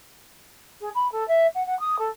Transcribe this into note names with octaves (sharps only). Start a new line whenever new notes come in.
G#4
B5
A4
E5
F#5
F#5
D#6
A4